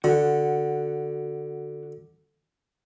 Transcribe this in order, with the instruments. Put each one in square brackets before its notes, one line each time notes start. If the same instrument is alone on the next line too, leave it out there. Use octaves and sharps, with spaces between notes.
[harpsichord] D3 [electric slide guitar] F#4 F#5